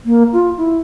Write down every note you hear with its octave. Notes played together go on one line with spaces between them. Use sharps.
A#3
F4
E4